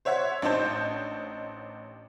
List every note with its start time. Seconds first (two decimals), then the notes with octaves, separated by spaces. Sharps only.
0.05 C5 C#5 E5 F#5 G#6
0.42 A1 D4 D#4 C5 A5 G6